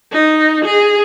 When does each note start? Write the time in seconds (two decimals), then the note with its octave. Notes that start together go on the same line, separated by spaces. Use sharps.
0.12 D#4
0.65 G#4